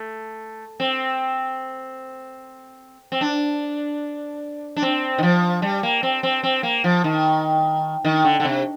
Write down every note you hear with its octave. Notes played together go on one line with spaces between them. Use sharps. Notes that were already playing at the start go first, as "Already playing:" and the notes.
Already playing: A3
C4
C4
D4
D4
C4
D#3
F3
G3
A#3
C4
C4
C4
A#3
F3
D#3
D#3
D3
D3
C3